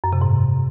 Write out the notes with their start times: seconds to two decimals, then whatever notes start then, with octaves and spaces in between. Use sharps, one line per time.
0.04 F#2
0.13 C3
0.21 G#2